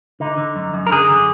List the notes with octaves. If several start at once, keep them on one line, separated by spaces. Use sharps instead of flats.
D3 D#4
D3
F#2
F#2
A#4
D3 G#4
D3